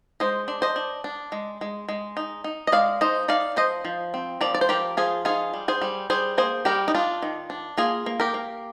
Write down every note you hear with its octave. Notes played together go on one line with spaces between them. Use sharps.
G#3 C5 D#5
D4
C5 D#5
D4
D4
G#3
G#3
G#3
D#4
D#4
D#5
G#3 D5 F5
D#4 C5 D#5
D#4 D5 F5
F3 C5 D#5
F3
C4
F3 A#4 D5
D5
C5
F3 G4 A#4
F3 F4 G#4
D#4 F4 G#4
G3
G#4 C5
G3
G3 G#4 C5
A#3 G#4 C5
G3 G4 A#4
D#4
D4 F4
D#3
D4
A#3 F4 G#4
A#3
G4 A#4
A#3